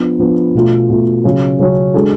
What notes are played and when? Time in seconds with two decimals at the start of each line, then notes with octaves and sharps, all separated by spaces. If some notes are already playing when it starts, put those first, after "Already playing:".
Already playing: F3 B3 D4
0.19 F3 B3 D4
0.55 B2 A3 F4
0.90 B2 A3 F4
1.24 C#3 F#3 C#4
1.59 C#3 F#3 C#4
1.94 G#3 D4 F#4 A4